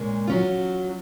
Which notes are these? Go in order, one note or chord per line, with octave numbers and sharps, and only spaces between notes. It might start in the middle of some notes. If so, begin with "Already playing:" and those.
Already playing: A#2 G#3 C#4
F#3 C#4 F4